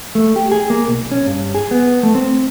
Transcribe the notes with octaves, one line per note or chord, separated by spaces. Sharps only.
A3
G4
G#4
A#3
B1
C#4
G2
G#4
B3
A3
C4